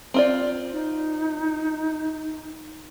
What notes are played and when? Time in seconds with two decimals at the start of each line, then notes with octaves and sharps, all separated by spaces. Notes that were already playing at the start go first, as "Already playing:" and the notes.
0.14 C4 F4 D5
0.73 D#4